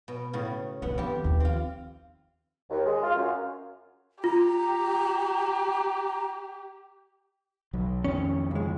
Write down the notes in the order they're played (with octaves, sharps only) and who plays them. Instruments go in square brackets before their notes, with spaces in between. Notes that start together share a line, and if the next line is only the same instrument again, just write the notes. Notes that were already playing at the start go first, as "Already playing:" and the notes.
[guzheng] B2
A2 C#3
[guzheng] G2 B3 F#5 [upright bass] D#3 F3
[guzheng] F2 G4
[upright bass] D#2 D#3
[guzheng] C4 F4
[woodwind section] D#2
G#3
F4
F#2
[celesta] F4 [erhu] G4 [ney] A#5
[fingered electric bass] B1 F#3
[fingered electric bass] F2 D#3 [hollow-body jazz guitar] C#4
[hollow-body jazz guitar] C#2 G#3